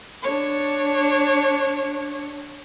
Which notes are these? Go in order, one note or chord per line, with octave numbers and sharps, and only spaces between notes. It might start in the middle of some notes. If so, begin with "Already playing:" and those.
D4 C#5